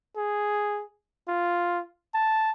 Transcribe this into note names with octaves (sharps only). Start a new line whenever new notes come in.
G#4
F4
A5